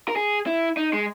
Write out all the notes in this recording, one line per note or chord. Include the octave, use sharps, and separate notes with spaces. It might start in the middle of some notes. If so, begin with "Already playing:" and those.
A#4
G#4
E4
D#4
G#3